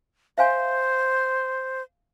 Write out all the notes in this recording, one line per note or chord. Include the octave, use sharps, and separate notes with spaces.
C5 E5 F5 G#5